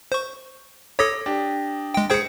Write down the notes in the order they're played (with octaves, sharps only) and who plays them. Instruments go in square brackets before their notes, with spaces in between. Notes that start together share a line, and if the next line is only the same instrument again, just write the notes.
[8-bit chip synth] C5 C#6
[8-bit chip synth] A4 C#5 [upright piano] D6 D#6 A#6
[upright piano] D4 G4
[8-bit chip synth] G#3 G5
[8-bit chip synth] G#4 C5 G5 [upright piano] G#6 C#7